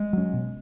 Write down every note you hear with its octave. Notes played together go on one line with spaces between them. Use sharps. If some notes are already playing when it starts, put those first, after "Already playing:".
Already playing: G#3
F#3 C#4
B2